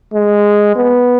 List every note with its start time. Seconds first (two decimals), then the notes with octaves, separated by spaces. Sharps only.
0.14 G#3
0.76 B3